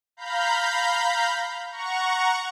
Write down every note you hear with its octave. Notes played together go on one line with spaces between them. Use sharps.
F5 A#5 B5 G6
F#5 A#5 C#6